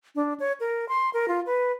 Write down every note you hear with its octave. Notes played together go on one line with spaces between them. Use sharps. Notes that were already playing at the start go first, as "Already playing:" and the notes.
D4
C#5
A#4
C6
A#4
F4
B4